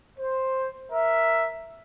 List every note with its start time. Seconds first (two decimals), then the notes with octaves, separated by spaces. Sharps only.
0.19 C5
0.91 A#4 E5